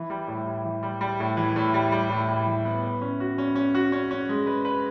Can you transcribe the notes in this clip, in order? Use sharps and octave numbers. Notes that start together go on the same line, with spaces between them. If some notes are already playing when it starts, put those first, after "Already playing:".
Already playing: E3
G3
A2
G3
E3
G3
G3
A2
E3
A2
G3
G3
A2
G3
E3
B3
B4
C#4
F#4
C#4
C#4
F#4
C#4
C#4
G#3
B4
B4